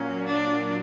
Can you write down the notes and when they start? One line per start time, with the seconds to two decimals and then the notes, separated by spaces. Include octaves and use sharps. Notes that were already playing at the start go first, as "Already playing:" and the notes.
Already playing: A#2 F#3 A#3 C#4
0.27 D4